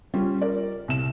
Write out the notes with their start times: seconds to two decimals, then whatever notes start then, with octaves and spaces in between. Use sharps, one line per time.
0.14 G3 C#4 F4
0.41 A#4 D5
0.88 C2 E7